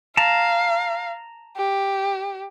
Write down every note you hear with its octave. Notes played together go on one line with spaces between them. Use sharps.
F5 A5 A#5
G4